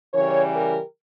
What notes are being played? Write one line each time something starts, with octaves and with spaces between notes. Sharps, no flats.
C#3 E3 G3 A#4 C#5
G4 A#4